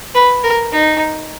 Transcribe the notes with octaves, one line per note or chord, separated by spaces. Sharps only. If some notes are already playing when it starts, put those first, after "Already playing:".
B4
A#4
D#4